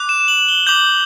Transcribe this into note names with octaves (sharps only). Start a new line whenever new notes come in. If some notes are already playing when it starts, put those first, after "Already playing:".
Already playing: D6 F#6
E7
F#7
G7
D6 G6 F#7